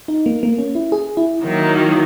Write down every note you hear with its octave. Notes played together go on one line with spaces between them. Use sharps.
D#4
A#3
A#3
C#4
E4
G#4
E4
D#3 F#3 A#3